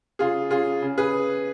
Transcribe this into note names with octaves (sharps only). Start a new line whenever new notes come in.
C#3 F4 G#4
C#3 F4 G#4
C#3
G#4 B4